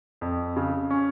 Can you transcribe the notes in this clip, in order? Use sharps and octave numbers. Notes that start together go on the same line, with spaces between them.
F2
C#3
C#4